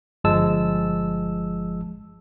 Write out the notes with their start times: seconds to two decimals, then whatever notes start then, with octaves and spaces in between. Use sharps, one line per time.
0.24 G1 F3 G#3 A5 E6